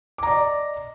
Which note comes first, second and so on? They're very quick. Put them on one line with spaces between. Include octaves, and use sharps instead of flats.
D6 A#5 D5 D#5